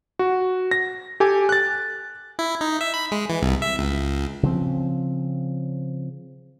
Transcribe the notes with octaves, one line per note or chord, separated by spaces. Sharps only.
F#4
A#6
G4 A4 G#5 D6
F#6 A6
E4
D#4
E5
B5
G#3
E3
C2
E5
C#2
C#3 F3 C4